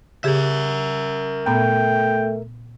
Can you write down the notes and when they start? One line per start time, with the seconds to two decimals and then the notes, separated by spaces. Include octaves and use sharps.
0.24 C#3 G4 G#4 A#4 E5
1.47 A#2 A3 B3 G5 A#5